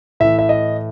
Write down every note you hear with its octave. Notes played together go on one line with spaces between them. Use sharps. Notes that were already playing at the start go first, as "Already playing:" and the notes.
A2 E3 E5
E5
D#5